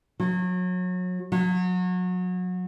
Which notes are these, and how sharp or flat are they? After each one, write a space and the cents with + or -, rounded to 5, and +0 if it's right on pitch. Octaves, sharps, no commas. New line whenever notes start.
F#3 -30
F#3 -30